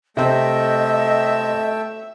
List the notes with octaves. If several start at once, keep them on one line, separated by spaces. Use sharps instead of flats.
C3 A3 C4 D#5 E5 G5